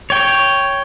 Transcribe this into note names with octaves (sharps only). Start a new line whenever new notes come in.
C#5 G5